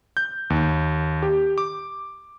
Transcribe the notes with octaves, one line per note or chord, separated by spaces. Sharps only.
G6
D#2
G4
D6